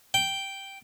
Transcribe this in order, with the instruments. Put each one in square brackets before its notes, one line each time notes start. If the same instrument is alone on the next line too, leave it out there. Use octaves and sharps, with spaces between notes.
[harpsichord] G5